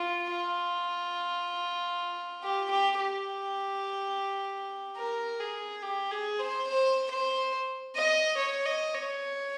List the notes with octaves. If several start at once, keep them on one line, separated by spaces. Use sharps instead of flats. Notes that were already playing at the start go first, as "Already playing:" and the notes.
Already playing: F4
F4
G4
G4
G4
A#4
G#4
G4
G#4
C5
C5
C5
D#5
C#5
D#5
C#5